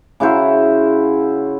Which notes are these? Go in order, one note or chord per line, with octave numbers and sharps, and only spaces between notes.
C#3 E4 F#4 C5